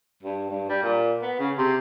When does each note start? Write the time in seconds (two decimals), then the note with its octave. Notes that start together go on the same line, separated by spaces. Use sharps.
0.23 G2
0.50 G2
0.69 G3
0.83 A#2
1.22 B3
1.39 C#3
1.58 C3